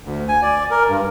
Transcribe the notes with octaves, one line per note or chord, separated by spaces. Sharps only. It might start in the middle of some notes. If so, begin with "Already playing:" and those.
D2
G#5
D5
A#4
G2